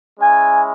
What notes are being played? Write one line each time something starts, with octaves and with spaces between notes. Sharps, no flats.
G#3 C#4 E4 G#5